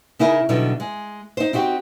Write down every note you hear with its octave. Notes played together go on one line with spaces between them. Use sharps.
C#3 D#4 E4 G#4 A#4
B2 D3 F#3 G3 B3 D#4
G#3
D#4 C5
C4 D#4 F#4 G4